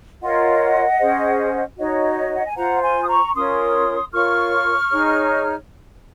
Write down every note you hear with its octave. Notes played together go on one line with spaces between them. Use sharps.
F4 A#4 C#5 D#5 F#5
C#4 G#4 C5
D#4 F#4 C#5 D#5
F#5
G#5
F4 C5 F#5 A#5
G#5 C6
D#6
A#5 C#6
C#4 F4 A#4 C#5 C6 D#6
F4 A#4 C#5 C#6 F6
D#4 G#4 C#5